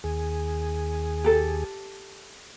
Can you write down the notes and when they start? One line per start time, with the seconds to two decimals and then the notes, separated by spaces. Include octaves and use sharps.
0.04 D#2 G#4
1.24 G4 A4